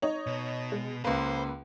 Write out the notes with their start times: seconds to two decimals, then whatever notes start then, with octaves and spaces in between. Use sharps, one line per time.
0.02 D#4 C#5
0.27 B2
0.72 G#3
1.04 C#2 A#3 B4 C5